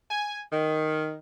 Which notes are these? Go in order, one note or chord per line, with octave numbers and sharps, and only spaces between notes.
G#5
D#3